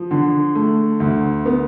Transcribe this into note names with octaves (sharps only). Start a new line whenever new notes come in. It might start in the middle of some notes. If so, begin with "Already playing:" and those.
Already playing: F3
D3
A3
D2
B3